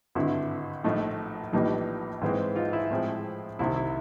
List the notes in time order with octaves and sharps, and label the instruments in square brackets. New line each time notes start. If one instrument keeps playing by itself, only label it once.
[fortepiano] G#1 G2 D3 E4
A#1 A2 F3 A3 D#4
A#1 A2 E3 G3 A#3 D#4
G#2 E3 G#3 C4
D#4 F4
E4
A2 F3 G#3 C4
C2 C3 D#3 E4
E4